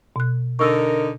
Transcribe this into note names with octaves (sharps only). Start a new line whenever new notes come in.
B2 F#6
D3 D#4 A#4 C#6 E6